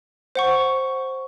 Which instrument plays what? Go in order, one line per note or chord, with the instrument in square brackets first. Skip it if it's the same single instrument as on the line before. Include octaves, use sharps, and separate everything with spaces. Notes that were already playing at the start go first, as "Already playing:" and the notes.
[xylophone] C5 F#5 C#6